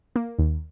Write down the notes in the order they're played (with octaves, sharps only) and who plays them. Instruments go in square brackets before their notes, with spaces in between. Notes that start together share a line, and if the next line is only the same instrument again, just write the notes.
[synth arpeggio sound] A#3
D#2